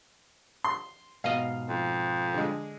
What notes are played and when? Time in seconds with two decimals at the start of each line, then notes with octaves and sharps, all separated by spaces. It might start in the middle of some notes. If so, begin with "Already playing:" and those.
0.64 C6
1.24 G#2 B2 D#5 F5
1.69 F2
2.34 D3 G#3